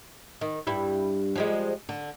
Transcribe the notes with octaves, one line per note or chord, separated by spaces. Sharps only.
D#3
G2 G3 E4
F3 G3 G#3
D3